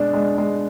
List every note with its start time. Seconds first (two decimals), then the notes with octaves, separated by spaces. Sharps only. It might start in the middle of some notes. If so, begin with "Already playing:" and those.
Already playing: B2 G#3 D4
0.13 G#3
0.38 G#3